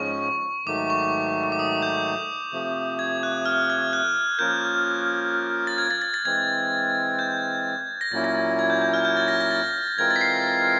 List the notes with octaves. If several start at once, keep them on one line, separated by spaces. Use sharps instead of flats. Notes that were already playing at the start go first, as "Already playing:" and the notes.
Already playing: G#2 F3 G#3 C#4 C#6
G#2 D#3 F#3 A3 D6
C#6
C#6
D6
D#6
G6
C3 F3 A3
G#6
F#6
F6
G#6
F#6
F3 A#3 C#4 F4 A#4 G6
A6
G#6
A6
A6
A6
E3 G#3 C4 G#6
G6
A#6
A#2 F#3 A#3 C#4 E4 A6
A#6
A6
G#6
G6
G6
F6
G6
A6
A#6
A#6
A6
E3 G#3 C4 F4 A#4 G#6
A6
B6
C7